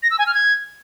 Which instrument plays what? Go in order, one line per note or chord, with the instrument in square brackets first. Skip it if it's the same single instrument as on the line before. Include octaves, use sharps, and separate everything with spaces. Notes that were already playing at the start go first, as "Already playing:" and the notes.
[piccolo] A#6
E6
G#5
F6
G#6